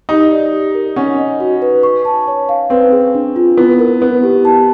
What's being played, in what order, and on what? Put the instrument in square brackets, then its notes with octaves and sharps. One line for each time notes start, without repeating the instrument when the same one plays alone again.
[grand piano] D#4 [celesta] G4
[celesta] D5
G4
A#4
[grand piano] C#4 [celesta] F#5
[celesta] D#5
F#4
B4
C#6
A5
C#5
F5
[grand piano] C4 [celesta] B4
[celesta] G#4
D4
F4
[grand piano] B3 [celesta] E4
[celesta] A#4
[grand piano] B3 [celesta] E4
[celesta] G4
A5